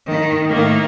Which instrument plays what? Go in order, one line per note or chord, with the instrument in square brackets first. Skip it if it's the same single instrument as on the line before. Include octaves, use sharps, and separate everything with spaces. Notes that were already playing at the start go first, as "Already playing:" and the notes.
[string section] D#3
A2 D#3 A#3